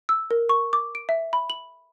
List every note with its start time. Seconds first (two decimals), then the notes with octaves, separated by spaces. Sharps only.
0.09 E6
0.31 A#4
0.49 C#6
0.73 D6
0.95 D7
1.09 E5
1.33 B5
1.50 F#7